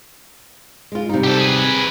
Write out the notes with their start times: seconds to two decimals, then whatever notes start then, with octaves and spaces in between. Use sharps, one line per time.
0.92 G#3 F4
1.09 C3 G3 D#4
1.24 G4 A4
1.38 G#4 B4